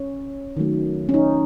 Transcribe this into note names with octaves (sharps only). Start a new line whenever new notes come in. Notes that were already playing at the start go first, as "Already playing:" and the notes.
Already playing: C#4
D#3 F#3 A3
C#4
D#4